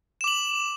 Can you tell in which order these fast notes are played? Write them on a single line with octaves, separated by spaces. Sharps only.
E7 D6 F#7